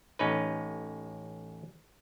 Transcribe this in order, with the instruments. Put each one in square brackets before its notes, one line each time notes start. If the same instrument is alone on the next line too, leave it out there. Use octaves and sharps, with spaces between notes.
[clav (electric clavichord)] A1 C#4 D#4 B4